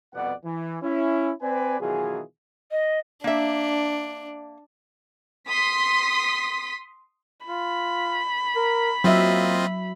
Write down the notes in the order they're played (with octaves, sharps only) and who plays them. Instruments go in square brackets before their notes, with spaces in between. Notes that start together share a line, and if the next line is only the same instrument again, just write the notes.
[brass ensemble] C2 F2 B2 B3 D5 F#5
E3
C#4 E4
C4 B4 D5 G#5
B2 D#3 E3 F#3 F4 G#4
[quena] D#5
[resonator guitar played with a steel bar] A#3 E5 [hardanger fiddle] D4
[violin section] C6 D#6 B6
[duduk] F4 [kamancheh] B5
[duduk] A#4
[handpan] F#3 E5 [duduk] A#3 [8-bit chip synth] C4 F4 D#5